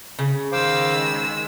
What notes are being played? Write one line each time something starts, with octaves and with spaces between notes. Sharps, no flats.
C#3
D#3 C5 F5 D6 E6
G#3